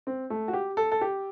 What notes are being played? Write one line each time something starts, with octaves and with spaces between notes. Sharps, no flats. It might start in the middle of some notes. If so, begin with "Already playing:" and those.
C4
A3
F#4
G4
A4
A4
G4